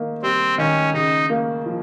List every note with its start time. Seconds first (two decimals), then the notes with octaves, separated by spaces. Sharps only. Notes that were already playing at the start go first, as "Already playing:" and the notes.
Already playing: D#3 A#3
0.22 G3 C4
0.58 D#3 C#4
0.94 C#3 D#4
1.30 A#3
1.66 F3